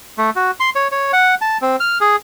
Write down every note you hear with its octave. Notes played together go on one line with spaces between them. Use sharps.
A3
F#4
C6
C#5
C#5
F#5
A5
C4
F6
G#4